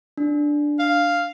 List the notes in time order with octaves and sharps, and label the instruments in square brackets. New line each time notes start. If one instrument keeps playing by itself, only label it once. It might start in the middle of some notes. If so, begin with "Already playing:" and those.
[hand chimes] D4
[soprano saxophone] F5